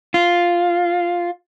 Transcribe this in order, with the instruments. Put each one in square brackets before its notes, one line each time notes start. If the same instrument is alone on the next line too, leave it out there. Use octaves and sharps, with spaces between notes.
[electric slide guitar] F4